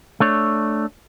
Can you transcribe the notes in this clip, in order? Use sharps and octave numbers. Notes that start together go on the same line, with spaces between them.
A3 D4 C#5